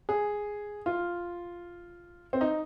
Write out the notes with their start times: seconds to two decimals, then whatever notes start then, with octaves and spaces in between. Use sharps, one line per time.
0.09 G#4
0.86 F4
2.33 C4
2.41 D#4